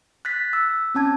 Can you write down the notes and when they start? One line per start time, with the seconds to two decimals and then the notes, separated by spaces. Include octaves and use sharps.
0.25 F#6 A6 B6
0.53 E6
0.95 C4 C#4 A5 G#6